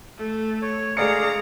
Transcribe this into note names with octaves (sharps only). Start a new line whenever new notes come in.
A3
C#5
D3 G#3 G#4 D5 F5 A#5 C#7